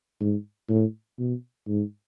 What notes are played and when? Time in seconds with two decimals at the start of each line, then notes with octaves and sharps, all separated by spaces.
0.21 G#2
0.69 A2
1.19 B2
1.68 G#2